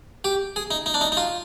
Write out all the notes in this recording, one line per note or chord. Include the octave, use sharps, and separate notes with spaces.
G4
G#4
D#4
D#4
D4
D#4
D#4
F4